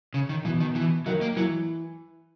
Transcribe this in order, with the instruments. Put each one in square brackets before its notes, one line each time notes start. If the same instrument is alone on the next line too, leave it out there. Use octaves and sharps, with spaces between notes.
[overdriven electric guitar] C#3
D#3
[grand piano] B2 [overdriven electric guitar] E3
[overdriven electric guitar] D#3
E3
[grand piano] D#3 [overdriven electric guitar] F#3
[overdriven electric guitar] A#3
[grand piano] E3 [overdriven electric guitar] F#3